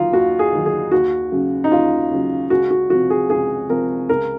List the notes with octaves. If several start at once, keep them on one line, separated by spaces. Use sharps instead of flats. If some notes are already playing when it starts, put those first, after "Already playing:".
Already playing: D#2 D#3 F#3 D#4 F4
D#2 F#4
G#4
D#3 F#3
G#4
D#2 F#4
C#3 F#3
D#4
D#2 F4
C#3 F#3
C#2 F#4
F#4
C3 F3 F#4
G#4
C#2 G#4
C3 F3 A#4
C#2 A#4